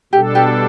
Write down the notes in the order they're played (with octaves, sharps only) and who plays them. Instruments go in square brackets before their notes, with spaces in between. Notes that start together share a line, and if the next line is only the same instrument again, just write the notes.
[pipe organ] B2 G3 D4 A4 [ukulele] G4
[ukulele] G4